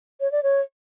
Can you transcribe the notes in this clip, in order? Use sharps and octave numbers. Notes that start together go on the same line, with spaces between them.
C#5
D5
C#5